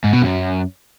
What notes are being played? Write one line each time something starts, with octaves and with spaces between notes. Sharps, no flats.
G#2
B2
F#2